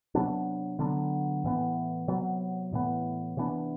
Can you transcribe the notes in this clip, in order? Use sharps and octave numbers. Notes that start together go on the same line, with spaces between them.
C3 F#3 B3 D4
D3 F#3 B3 D4
A2 E3 B3
C3 F#3 B3
A2 E3 B3
C3 E3 B3 D4